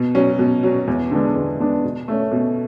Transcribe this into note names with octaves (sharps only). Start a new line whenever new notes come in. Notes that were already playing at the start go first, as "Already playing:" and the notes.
Already playing: B2
F#3 C#4
B2
F#3 C#4
E2
D3 G#3 B3 D4
E2
D3 G#3 B3 D4
B2
A3 C#4
B2